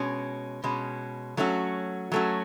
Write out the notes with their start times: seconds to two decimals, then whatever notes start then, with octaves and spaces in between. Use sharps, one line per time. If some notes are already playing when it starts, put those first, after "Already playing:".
Already playing: B2 G#3 C#4
0.64 B2 G#3 C#4
1.37 F#3 A3 C#4 F#4
2.12 F#3 A3 C#4 F#4